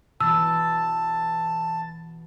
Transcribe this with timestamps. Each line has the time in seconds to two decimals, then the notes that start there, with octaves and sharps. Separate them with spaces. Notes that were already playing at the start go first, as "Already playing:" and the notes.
0.20 B2 E3 B3 A5 E6